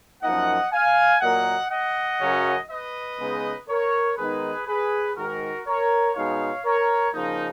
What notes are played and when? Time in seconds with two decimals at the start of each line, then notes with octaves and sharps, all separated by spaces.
0.22 F#2 F3 A#3 D#4 D#5 F#5
0.72 F5 G#5
1.21 A#2 F#3 A#3 D#5 F#5
1.70 D#5 F#5
2.20 F#2 C#3 F#3 C#4
2.70 B4 D#5
3.19 C#3 G#3 B3 D#4
3.68 A#4 C#5
4.17 D#3 G#3 B3 D#4 G#4 B4
4.66 G#4 B4
5.16 G#2 D#3 G#3 F#4 A#4
5.66 A#4 C#5
6.15 B2 G#3 D#4 C#5 F5
6.64 A#4 C#5
7.14 C#3 F3 A#3 D#4